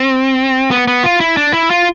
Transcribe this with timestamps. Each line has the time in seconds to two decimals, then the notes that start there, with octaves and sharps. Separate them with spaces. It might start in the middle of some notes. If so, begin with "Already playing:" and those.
Already playing: C4
0.71 B3
0.88 B3
1.04 F4
1.20 E4
1.37 D4
1.53 E4
1.70 F4